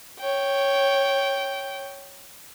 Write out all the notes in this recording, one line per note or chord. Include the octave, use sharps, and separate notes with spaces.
C#5 G5